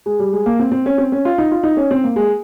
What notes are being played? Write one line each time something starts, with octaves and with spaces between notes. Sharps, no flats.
G#3
G3
G#3
A#3
C4
C4
C#4
C4
C#4
F4
D#4
F4
D#4
C#4
C4
A#3
G#3